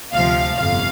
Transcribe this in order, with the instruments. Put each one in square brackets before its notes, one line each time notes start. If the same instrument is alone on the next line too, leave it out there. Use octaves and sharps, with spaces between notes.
[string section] D2 C3 F3 F5
G1 F2 C3 F5